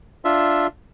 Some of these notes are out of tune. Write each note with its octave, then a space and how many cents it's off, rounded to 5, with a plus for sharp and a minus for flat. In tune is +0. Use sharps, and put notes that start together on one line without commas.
D4 +0 F4 +0 E5 +0